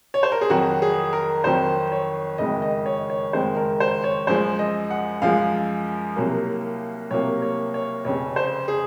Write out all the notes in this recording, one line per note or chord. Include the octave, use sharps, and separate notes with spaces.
C#5
C5
A#4
G#4
F2 D#3 F#3 F#4
G#4
A#4
F2 D#3 F#3 C5
C#5
F#1 F2 D#3 G#3 D#5
D#5
C#5
C#5
F#1 F2 D#3 G#3 C5
A#4
C5
C#5
F#2 F3 G#3 C5
D#5
F#5
F#2 F3 G#3 F5
C2 C3 F#3 A#3
C2 C3 F#3 A#3 C#5
C#5
C#5
F1 F2 C#3 C#5
C5
G#4